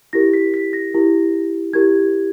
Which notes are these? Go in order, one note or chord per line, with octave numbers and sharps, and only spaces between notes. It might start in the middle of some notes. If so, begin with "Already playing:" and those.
E4 G4 A#4 A#6
B6
B6
A#6
E4 G4 A#4
E4 G4 A#4 G#6